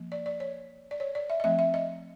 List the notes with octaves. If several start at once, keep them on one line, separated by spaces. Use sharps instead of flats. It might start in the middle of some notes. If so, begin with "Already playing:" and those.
Already playing: F3 A#3
D5
D5
C#5
D5
C#5
D5
E5
D#5
F3 A3 C4 E5
E5
D#5